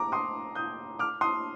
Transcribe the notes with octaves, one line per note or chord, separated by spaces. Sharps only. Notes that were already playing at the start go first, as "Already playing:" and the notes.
Already playing: A#5 D6
C6 D#6
D#6 G6
D6 F6
C6 D#6